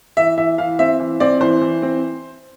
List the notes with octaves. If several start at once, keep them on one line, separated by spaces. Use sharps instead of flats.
E3 E5
E3 E5
E3 F5
C4 E5
E3
C4 D5
E3 C5
E3
C4